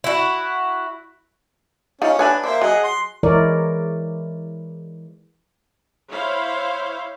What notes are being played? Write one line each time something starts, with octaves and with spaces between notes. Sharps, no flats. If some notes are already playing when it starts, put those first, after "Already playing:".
E4 F#4
C#4 D#4 F4 F5
D4 B4 C#5 G#5 B5
A#3 C5 D5 E5
F#3 G#4 D#5 F#5
C6
E3 G#3 E4 A#4 C#5 D5
E4 C5 C#5 F5